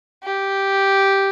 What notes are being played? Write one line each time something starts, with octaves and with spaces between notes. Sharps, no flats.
G4